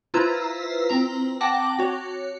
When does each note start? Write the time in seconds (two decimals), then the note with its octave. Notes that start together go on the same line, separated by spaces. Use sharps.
0.14 E4 F4 B4 C5 A#5 E6
0.89 C4 A#5
1.41 F#5 G5 A5 D6 A#6
1.79 F#4 C#5